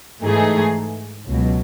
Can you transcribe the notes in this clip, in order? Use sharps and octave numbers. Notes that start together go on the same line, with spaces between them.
G#2 E3 A3 D#4 G#4
C#2 B2 F#3